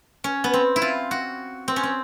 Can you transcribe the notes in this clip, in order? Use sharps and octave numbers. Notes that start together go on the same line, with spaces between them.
C#4
B3
C4
E4
F4
F#4
C4
C#4
C4